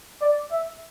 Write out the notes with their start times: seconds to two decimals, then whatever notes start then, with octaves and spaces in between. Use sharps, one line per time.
0.22 D5
0.52 E5